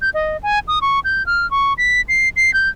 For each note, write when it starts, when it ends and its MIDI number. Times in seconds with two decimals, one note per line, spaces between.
0.01 0.10 91
0.14 0.37 75
0.43 0.59 80
0.68 0.79 87
0.81 1.00 85
1.04 1.25 91
1.26 1.49 89
1.51 1.73 85
1.78 2.01 95
2.08 2.29 96
2.36 2.53 96
2.54 2.69 91